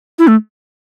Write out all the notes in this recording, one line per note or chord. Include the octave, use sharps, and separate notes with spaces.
E4
A3